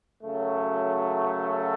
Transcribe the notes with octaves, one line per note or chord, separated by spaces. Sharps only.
F#2 C#3 F#3 A3
A4